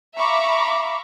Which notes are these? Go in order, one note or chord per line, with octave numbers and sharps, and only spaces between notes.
E5 F5 A#5 B5 C#6 D6